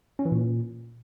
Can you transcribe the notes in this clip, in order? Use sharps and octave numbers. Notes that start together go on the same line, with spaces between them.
C#4
E3
A#2